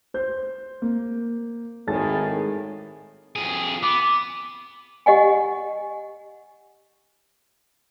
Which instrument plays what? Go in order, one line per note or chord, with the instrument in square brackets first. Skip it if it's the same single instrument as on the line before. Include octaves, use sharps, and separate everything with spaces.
[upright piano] C5 G6
A#3
[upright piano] G#1 A5 A6 [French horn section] A2 D#3 G#4
[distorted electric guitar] F2 G#4
[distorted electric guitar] B3 [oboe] D6
[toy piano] G4 D#5 F#5 G#5